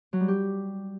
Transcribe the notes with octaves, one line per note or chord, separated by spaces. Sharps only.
F#3
G3
G4